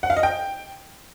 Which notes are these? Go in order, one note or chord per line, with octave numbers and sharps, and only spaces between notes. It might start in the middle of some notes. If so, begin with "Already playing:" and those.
F#5
F5
D#5
G5